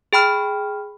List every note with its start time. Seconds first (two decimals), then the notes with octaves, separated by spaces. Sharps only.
0.13 G#4 G5 B5 F6